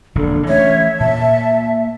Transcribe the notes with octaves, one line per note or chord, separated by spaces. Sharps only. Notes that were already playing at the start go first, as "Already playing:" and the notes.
E1 A#1 A#2 D3
E3 A3 C#4 C#5 E5
A#2 A5